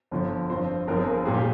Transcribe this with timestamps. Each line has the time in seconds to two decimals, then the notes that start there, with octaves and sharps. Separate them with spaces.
0.11 G1 F2 D3 F3
0.50 G2 F3 C4 C5
0.87 G1 G2 F3 C4 A#4
0.97 G#4
1.05 A#4
1.25 A#2 G3 A#3 G#4
1.34 G4